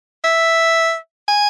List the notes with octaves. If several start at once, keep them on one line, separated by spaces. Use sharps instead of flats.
E5
G#5